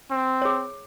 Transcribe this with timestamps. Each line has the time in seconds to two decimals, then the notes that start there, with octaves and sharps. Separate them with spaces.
0.11 C4
0.42 G#4 C#5